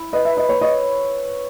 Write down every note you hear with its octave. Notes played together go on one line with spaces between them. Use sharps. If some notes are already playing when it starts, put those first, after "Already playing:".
Already playing: E4
B4 D#5
E5
E4 D#5
C#5
C#5 D#5